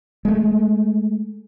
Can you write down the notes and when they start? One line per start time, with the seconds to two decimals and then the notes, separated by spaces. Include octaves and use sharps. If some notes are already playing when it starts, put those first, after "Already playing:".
0.25 G#3 A3